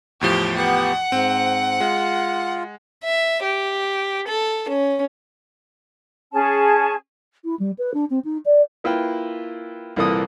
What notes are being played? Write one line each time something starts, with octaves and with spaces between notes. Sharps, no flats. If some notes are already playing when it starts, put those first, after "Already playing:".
E2 A2 F3 G4
B3 G4 F#5
G#2 C4
G#3 F4
E5
G4
A4
C#4
C#4 G#4 A5
E4
G3
B4
D4
C4
D#4
D5
A#3 E4 F4 B4 G5
C2 A#2 E3 A#3 A4 D#6